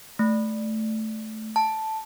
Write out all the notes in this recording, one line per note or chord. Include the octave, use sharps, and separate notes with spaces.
A3
A5